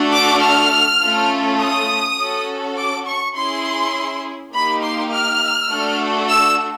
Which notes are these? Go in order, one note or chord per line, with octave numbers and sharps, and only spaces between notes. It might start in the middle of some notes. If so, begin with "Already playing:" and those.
Already playing: A3 D4 F#4 A4
D6
F6
A3 C#4 F4 A4
D#6
C#4 F#4 A4
D6
C#6
C#4 E4 G#4 C6
A#3 D#4 G4 B5
C6
F6
A3 D4 F#4 A4
E6